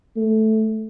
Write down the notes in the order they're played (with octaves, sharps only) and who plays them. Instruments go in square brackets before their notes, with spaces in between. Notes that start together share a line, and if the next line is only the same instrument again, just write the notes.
[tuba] A3